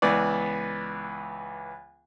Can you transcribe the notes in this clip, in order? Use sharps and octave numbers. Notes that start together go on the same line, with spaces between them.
C#2 E3 B3 D5